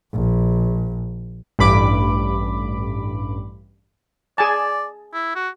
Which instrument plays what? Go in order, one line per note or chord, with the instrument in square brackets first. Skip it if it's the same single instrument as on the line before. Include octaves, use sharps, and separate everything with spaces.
[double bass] A#1
[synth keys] A1 G2 B5 D6
[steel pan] G#4 G#5 A5 [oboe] D5
[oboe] E4
F#4